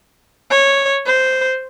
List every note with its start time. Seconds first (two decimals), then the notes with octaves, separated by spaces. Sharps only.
0.51 C#5
1.06 C5